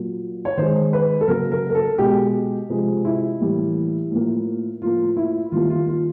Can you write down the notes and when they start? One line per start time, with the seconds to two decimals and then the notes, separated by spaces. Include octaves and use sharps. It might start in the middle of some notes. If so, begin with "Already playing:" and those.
Already playing: A#2 F#3 A#3
0.45 C#5
0.57 D#3 G#3 C5
0.93 B4
1.21 A4
1.28 C#3 F#3 A#3 A#4
1.52 A#4
1.70 A#4
1.75 A4
1.98 B2 G#3 G4
2.69 C3 F3 G#3
3.05 E4
3.40 A2 E3 G3 A#3
4.11 A2 F3 A#3
4.81 A2 F3 A#3 F4
5.17 E4
5.52 D#3 G3 A#3 F4
5.70 F4
5.87 F4